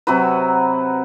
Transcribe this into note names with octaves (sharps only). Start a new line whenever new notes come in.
C3 F#3 F#4 B4